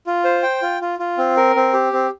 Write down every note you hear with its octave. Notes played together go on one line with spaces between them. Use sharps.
F4
C5
G5
F4
F4
F4
C4
A#4
C4
G4
C4